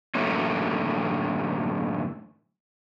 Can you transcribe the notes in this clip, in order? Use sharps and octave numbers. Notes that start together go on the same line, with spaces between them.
F#2 A2 D3 A3 A#3 C#4